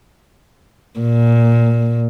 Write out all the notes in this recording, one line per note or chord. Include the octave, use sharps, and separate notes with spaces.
A#2